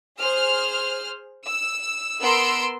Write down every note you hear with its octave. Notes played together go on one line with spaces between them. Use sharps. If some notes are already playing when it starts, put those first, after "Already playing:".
G#4 C5 F6
E6
B3 A#4 C6 E6 D7